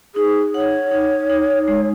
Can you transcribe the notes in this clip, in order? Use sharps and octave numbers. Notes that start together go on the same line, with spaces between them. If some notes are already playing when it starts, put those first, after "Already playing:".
D#4 G#4
C#5 F#5
D#4
D#4
G#3